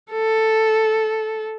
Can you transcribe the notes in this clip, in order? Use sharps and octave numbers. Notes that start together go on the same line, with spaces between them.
A4